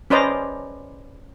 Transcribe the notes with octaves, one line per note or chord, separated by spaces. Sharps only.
C#4 B4 C5 D5 D#5 A#5